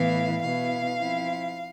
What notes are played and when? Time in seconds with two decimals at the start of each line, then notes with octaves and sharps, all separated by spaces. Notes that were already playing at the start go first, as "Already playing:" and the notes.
Already playing: A2 E3 B3 E4 F5
0.42 B2 B3 E4 F5
0.98 F3 C4 E4